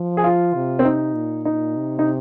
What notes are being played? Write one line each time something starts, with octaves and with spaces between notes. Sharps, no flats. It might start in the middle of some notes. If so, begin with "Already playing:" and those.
Already playing: F3
G#4
F4
C3
C4
D#4
A#2
D#4
C3
D#4